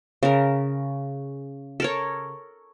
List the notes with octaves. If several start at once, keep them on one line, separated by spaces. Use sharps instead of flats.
C#3 A#4
A4 A#4 C#5